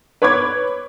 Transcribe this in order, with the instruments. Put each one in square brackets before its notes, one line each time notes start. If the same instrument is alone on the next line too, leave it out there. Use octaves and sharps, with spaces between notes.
[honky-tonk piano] B4 C#5 C#6 D6 G#6